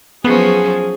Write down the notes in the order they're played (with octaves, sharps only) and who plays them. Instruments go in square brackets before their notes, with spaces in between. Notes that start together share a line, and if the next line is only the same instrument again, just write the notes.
[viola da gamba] F3 F#3 C#4 [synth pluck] B3 [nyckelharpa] G#4